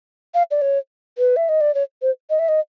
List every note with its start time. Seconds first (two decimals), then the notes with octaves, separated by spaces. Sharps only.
0.34 F5
0.51 D5
0.61 C#5
1.18 B4
1.36 E5
1.49 D#5
1.61 D5
1.75 C#5
2.02 C5
2.30 D#5
2.39 E5
2.48 D#5